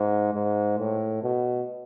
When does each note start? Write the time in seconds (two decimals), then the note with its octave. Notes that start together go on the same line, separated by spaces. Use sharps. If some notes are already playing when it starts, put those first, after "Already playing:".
Already playing: G#2
0.33 G#2
0.78 A2
1.23 B2